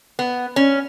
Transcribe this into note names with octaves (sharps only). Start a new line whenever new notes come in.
B3
C#4